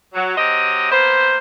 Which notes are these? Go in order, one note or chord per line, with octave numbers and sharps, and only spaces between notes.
F#3
F#3 C4 G4 D#5
A#3 B3 C5